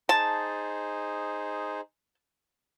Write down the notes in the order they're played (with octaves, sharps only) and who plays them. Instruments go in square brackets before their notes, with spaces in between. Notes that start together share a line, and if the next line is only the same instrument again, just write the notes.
[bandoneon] D#4 G#4 C5 [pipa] A5